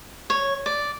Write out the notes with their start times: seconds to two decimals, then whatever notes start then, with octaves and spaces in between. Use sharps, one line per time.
0.30 C#5
0.66 D5